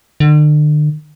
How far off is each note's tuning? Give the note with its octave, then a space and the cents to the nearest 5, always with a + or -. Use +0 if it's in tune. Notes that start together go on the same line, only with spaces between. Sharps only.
D3 +40